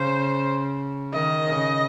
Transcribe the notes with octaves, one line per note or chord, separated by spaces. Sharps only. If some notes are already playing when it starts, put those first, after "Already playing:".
Already playing: C#3 C5
D#3 D#5
C#3